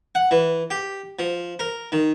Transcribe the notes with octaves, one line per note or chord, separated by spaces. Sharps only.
F#5
E3
G4
F3
A#4
D#3